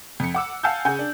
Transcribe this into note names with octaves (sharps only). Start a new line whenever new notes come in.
F2 C#7
F#5 D6 E6
F5 F#5 G#5 A5 E6 G6
C#3 F#5 G#5 G6
D4